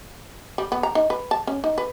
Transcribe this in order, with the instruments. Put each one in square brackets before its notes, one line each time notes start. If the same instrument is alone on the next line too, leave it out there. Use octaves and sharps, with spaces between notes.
[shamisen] G3
B3
A#5
D#4
B4
A5
C#4
D#4
B4